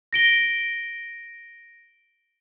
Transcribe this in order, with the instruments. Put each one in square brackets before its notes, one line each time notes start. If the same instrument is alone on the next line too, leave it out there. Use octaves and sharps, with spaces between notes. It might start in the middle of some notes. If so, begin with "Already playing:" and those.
[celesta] A#6 D7 G7